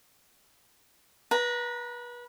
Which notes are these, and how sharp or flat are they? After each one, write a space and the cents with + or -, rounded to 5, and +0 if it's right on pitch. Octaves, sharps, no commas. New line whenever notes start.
B4 -30 A#5 +0